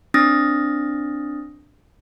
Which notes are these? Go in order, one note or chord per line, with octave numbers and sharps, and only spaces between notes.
C4 D4 D#6 F6 A6 A#6